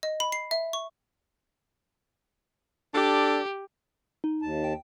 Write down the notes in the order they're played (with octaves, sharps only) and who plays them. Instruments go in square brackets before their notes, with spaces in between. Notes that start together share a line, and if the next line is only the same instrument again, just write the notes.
[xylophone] D#5
B5
C7
E5
C#6
[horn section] D4 A4 D5 [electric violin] G4
[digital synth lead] D#4
[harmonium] D#2 A5
[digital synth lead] G5